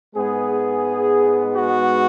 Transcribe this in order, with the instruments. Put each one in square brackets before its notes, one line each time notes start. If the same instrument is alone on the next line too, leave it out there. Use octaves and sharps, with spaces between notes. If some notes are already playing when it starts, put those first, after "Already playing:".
[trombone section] G#2 G#3 B3 G#4
F#4